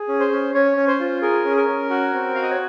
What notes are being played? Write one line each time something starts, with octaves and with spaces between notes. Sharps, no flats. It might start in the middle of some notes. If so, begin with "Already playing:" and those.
Already playing: G#4
C#4
C5
C#4
C#4 C#5
C#4
C5
F4
G#4 A#4
C#4
A#4
C#4
F#4
C4
F#4 F5
D#5
C#5